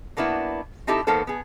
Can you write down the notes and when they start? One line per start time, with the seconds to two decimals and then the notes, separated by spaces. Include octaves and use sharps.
0.17 F#3 A#3 B3 D4 E4
0.87 C4 D#4 E4 G4 A4
1.07 D#3 A#3 B3 A4 C5
1.27 B3 G#4